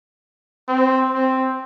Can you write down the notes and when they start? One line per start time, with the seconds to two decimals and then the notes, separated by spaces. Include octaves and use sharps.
0.68 C4
1.14 C4